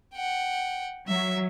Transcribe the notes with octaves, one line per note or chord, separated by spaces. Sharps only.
F#5 G5
F#3 E5